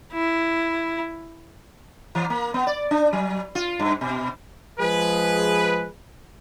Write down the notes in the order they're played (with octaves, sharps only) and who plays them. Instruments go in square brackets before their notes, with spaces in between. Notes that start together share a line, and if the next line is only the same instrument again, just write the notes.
[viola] E4
[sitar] E3
A#3
B3
D5
D4
F#3
F4
G2
B2
[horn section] F3 G#3 G#4 B4